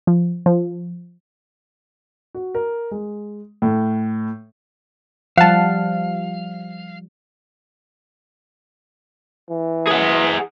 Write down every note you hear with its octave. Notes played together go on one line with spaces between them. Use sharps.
F3
F3
F#4
A#4
G#3
A2
F3 G3 F5 F#5 A5
E3
G#4 F#5